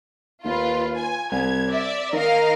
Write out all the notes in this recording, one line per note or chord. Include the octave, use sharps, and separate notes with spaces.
D#2 F4 B4
G#5
C2 G#6
D5 E5
D#3 A#4 D#5 F5